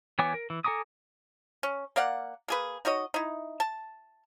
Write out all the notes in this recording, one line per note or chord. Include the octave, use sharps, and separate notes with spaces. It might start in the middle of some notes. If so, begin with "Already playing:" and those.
E3 B3 C#5 G#5 D6
A#4
E3
A4 G#5 A#5 D6 D#6
C#4
A#3 D5 F5 F#5
A#3 G#4 B4
D#4 F#4 C#5 D#5
D#4 E4
A5